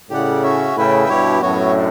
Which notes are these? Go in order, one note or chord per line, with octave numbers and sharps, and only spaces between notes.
A2 C#3 G4 D5 F#5
C#4 F#4 C#5 E5
A2 C#3 E4 B4 E5 G5
G2 B2 E4 G4 C#5
F#2 A2 B3 F#4 C#5
D4